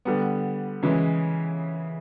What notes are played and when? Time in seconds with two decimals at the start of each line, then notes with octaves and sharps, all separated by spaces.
0.05 D3 G3 B3
0.83 C#3 E3 G#3